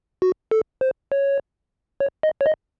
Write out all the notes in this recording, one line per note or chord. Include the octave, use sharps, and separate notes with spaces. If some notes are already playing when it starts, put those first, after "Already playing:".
F#4
A4
C5
C#5
C#5
D#5
C#5
D#5